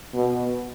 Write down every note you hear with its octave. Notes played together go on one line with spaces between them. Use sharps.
B2